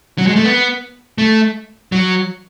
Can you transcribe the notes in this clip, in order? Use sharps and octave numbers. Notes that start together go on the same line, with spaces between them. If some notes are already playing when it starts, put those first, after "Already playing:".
F#3
G#3
A3
B3
A3
F#3